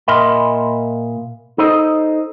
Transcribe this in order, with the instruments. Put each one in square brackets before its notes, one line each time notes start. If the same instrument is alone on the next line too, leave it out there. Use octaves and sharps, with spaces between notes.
[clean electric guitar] A#2 A#4 D#5 E5 B5 C6
D#4 A4 C5 D#5